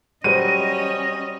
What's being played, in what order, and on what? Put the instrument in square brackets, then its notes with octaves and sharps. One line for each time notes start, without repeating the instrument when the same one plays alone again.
[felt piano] F#3 G3 C5 [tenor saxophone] C#4 [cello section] D#5 [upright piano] D#7